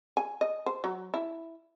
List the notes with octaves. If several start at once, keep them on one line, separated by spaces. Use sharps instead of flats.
G#5
D#5
C5
F#3
E4